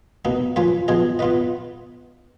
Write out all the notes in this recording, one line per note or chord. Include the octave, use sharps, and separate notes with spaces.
B2 A#3 D#4
F3 A#3 C#4 F4 B4
F3 B3 F4 G#4 D#5
B3 F4 B4 D#5